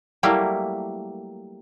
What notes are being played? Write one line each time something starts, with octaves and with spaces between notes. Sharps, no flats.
F#3 G3 A3 A#3 E4